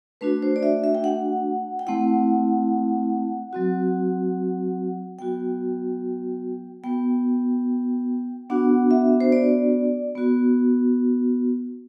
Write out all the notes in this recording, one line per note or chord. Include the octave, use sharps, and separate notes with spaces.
A3 D4 F#4 B4
C5
D5
E5
E5
G5
F#5
G5
A3 C4 E4 F#5
F#3 C4 F#4
F#3 B3 F#4 G5
B3 F#4 G5
B3 D4 F#4 F#5
E5
C5
D5
B3 F#4